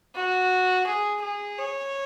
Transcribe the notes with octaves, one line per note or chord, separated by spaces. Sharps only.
F#4
G#4
G#4
C#5